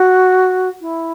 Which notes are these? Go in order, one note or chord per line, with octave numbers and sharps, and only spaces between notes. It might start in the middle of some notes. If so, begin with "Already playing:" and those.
Already playing: F#4
E4